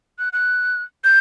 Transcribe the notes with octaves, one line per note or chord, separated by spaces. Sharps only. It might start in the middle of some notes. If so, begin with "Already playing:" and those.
F#6
F#6
G6